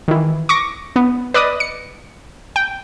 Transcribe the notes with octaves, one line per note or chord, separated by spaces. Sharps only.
D#3 E3
C#6 D6 A#6
B3
B4 D5 D#5 D#6
C#7
G5